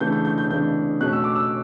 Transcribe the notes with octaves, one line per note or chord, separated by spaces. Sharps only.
C#3 E3 A3 D4 G6
G6
G6
G6
C#3 E3 A3 D4 G6
B2 A3 C#4 F#6
E6
D6
E6